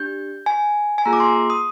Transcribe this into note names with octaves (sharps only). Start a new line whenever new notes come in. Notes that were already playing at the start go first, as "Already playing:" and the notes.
Already playing: D4 G4 G6
G#5
G#5
A#3 F4 G#4 A#5
D6
C6
D#6